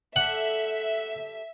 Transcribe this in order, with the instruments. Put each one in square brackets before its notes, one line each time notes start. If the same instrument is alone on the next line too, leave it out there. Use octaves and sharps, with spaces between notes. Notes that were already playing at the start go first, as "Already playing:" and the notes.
[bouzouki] G3 A4 [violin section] E5 [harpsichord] F#5